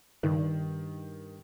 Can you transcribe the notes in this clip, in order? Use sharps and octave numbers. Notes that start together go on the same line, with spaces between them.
G2 D#3